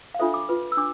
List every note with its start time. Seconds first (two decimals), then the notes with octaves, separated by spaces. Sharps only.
0.15 F5
0.19 D4 F4 A4 C5 E5
0.34 D6
0.49 F4 B4
0.72 E6
0.77 D4 D6